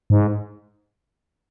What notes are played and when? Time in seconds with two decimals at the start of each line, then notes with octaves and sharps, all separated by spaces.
0.10 G#2